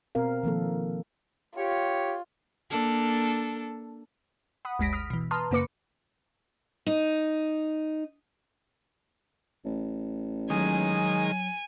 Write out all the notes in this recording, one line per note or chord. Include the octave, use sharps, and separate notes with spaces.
B2 C4 A#4 F5
D#3 F3 A#3 A4
F4 G4 C#5
A#3 D4 A4
F#5 B5 D#6
G1 D2 G#3 A#6 B6 D7
D#6 F6 B6
B2 E3
B4 A5 A#5 C6 D#6 F6
F#2 C#3 A#3 B4 D6 C#7
D#4
A1
D#3 F#3 G#3 G#5